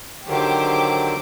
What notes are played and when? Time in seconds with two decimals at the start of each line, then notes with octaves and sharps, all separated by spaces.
0.28 D3 D#3 F#3 G4 C5 D6